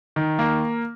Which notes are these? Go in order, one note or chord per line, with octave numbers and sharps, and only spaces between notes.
D#3
A#3